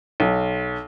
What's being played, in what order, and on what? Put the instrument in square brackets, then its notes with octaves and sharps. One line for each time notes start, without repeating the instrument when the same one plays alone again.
[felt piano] B1